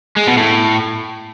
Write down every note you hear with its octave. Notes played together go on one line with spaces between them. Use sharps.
G#3
B2
A2